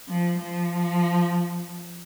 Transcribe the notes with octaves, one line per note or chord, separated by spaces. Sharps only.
F3
F3